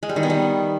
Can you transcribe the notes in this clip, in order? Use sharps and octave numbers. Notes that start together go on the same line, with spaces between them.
G#3
G3
D#3
B3
G3